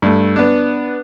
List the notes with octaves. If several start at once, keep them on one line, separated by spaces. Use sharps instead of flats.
G2 A3
B3 D4